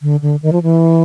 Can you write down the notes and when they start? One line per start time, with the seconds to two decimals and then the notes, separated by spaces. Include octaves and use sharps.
0.02 D3
0.22 D3
0.42 D#3
0.52 F3
0.63 E3